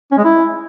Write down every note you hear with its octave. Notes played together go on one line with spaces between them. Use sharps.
C#4
G#3
E4